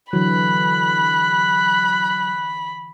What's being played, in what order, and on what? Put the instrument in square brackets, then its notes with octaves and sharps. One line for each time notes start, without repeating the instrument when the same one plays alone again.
[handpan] D3 E3 [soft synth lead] F#3 [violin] B5 [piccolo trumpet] F#6